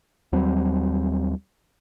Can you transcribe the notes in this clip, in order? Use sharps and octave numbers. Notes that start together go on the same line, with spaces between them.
D#2 F#3 G3 C4